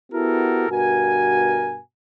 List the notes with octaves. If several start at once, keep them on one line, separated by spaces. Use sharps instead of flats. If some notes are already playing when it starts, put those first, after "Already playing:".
B3 E4 F#4 G4 A4 A#4
G2 B2 F#4 A#4 G#5